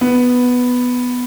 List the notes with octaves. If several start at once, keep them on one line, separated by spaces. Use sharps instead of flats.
B3